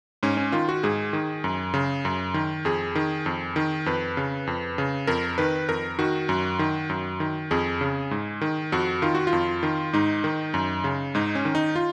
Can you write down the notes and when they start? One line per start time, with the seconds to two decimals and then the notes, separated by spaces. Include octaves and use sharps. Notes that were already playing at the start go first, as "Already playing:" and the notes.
0.23 G#2 C#4
0.37 C#4
0.52 D#3 F4
0.69 F#4
0.83 G#2 G#4
1.13 D#3
1.44 F#2
1.74 C#3
2.05 F#2
2.34 D#3
2.65 F2 G#4
2.95 D#3
3.26 F2
3.56 D#3
3.86 F2 B4
4.17 C#3
4.47 F2
4.78 C#3
5.07 F2 A#4
5.38 D#3 B4
5.69 F2 A#4
5.99 D#3 F#4
6.29 F#2
6.59 D#3
6.90 F#2
7.20 D#3
7.51 F2 G#4
7.81 C#3
8.11 G#2
8.41 D#3
8.72 F2 F#4
9.02 D#3 F4
9.15 F#4
9.27 F4
9.33 F2
9.63 D#3
9.93 G#2 D#4
10.24 D#3
10.54 F#2
10.84 C#3
11.15 G#2 D#4
11.35 C#4
11.45 D#3
11.55 D#4
11.76 F4